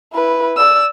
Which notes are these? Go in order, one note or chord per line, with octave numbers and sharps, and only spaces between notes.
E4 B4
D5 E6